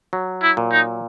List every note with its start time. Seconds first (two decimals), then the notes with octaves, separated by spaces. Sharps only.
0.13 F#3
0.42 E4
0.57 A#2
0.71 D#4